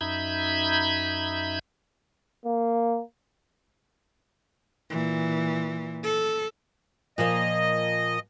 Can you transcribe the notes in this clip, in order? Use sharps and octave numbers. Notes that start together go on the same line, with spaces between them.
F#2 D#4 E5 B5 G6 G#6
A#3
A#2 E3
A4
A#2 F3 A#3 D#5